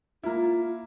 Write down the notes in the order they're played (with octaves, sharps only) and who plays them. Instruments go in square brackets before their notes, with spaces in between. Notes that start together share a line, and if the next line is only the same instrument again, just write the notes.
[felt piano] A#3 E4 [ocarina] F4